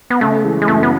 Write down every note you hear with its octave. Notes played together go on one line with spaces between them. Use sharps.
B3
C#3 A3
E3 G#3
G#3
F#2 A3
B3